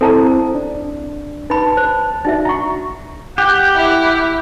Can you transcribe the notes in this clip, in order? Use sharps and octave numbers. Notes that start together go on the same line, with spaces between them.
C4 E4 A4 A5 A#5
D4
D#4 B4 A5 B5
C5
D4 D#4 F#4 E5
A#5 C#6
G4 F#5
E4